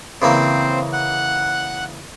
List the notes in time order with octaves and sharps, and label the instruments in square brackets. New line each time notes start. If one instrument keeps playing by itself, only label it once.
[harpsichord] C#3 E3 A#3 [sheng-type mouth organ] C4 C5
[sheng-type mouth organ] F#5 F#6